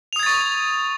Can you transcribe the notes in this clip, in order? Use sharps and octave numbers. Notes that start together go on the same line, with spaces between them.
C#6 D#6 G#6 A6 F7